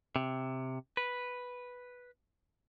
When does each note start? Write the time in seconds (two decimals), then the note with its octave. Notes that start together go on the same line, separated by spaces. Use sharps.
0.16 C3
0.97 B4